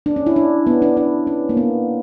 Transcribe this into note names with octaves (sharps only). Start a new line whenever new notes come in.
D4
C#4
E4
D4
B3
D4
D4
C#4
A#3
B3